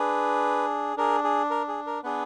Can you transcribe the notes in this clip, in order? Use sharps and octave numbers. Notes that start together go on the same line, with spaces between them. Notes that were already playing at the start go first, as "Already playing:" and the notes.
Already playing: D4 G#4 B4
D4 G#4 A#4
G#4
A#4
G#4
A#4
B3 D4 G#4 B4